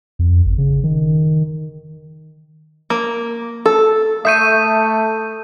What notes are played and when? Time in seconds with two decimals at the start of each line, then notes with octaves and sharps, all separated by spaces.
0.19 F2
0.45 G1
0.58 C#3
0.84 D#3
2.90 A#3
3.66 A4
4.25 A3 E5 C#6 D#6 G6 D#7